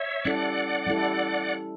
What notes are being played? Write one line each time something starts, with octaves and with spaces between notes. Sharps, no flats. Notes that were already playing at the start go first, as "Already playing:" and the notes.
Already playing: C#5 E5
G3 C#4 E4 A4 D5 F#5
G3 C#4 E4 A4